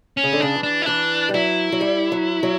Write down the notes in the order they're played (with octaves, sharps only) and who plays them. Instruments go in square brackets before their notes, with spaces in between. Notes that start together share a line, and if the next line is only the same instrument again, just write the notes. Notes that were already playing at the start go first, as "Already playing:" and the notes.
[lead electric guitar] C#4
[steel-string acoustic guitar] C#3
D3
[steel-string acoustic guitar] C#3 [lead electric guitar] D4
[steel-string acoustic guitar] E3
[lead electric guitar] D4
E4
[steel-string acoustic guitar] E3 [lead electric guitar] D4
[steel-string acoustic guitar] G3
[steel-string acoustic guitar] F#3 [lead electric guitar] E4
[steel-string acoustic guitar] F#3
G3
F#3
F#3